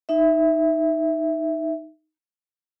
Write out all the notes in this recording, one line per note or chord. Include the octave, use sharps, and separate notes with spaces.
D#4 E5